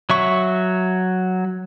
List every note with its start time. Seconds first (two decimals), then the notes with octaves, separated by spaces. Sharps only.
0.10 F#3 E5 C#6